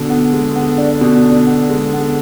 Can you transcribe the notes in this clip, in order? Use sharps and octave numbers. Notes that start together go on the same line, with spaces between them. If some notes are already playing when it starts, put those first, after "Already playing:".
Already playing: B2 D3
B3
G#3
B3
D4
B2
D4
B3
G#3
B3